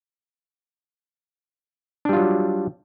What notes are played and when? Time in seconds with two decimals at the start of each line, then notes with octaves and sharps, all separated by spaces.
2.05 D4
2.09 G3
2.13 F4
2.17 F#3